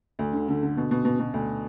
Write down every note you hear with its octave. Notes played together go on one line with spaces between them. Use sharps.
D2
D3
D3
D3
B2
B2
B2
B2
D2